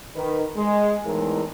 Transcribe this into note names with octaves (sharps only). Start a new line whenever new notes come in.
D#3 B4
G#3
E2 A2 E3 G#3 D#4 A#4